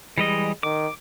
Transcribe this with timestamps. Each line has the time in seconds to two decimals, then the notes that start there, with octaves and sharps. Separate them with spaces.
0.18 E3 G3 G#3 D#5
0.63 D#3 D6